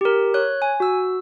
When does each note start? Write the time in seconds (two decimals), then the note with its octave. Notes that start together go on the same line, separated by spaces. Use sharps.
0.01 G4 A#4
0.34 C#5 F#6
0.62 G#5
0.80 F#4 E6